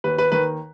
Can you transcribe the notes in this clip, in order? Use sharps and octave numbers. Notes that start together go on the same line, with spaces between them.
D#2 B4
B4
D#3 B4